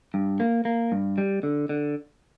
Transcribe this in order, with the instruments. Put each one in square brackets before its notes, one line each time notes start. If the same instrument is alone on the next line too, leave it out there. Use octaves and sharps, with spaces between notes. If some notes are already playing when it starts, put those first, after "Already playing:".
[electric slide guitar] G2
A#3
A#3
G2
G3
D3
D3